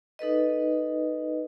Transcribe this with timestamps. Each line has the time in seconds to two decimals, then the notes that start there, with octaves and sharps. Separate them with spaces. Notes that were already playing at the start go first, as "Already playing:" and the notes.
0.19 D#4 A4 B4 D#5